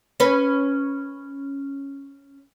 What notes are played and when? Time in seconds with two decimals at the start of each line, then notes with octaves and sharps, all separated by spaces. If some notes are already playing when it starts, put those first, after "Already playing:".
0.20 C#4 B4